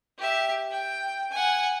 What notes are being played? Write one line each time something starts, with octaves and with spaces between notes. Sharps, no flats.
G4 E5
G5
F#5 G#5